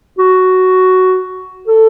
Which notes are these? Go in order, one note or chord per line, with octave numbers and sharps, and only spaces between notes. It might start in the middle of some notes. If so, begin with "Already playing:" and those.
F#4
A4